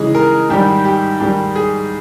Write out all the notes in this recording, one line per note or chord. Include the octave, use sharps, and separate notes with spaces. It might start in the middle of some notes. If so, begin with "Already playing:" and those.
Already playing: C#3 E3 G#3 D#4 G#4
A#4
G#2 D#3 G3 G4
G4
G#2 D#3 G3 G4
G#4